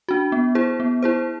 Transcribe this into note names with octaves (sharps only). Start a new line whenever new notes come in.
D4 F#4
B3
E4 G#4 C5
B3
E4 G#4 C5